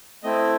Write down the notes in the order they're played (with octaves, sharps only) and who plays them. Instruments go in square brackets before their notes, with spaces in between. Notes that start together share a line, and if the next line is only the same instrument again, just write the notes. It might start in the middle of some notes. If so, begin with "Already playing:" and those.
[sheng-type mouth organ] A3 C4 E4 D#5